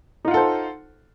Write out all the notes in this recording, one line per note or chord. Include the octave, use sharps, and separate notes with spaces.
D#4 F4 A4 C5 F#5